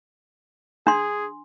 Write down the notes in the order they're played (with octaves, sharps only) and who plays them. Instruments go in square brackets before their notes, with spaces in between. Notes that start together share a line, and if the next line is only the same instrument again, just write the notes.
[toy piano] D4 C6 [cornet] G#4